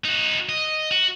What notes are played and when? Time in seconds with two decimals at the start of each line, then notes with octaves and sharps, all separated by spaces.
0.05 D#4 F#4
0.49 D#5
0.91 F#4